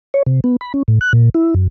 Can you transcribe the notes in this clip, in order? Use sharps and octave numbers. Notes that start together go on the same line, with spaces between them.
C#5
C3
B3
B5
C#4
A2
F#6
A#2
E4
F#2